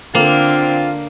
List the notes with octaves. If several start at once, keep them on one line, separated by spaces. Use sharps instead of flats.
D3 A#3 C4 D4 F4